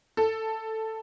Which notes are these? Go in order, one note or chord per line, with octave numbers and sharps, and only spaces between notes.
A4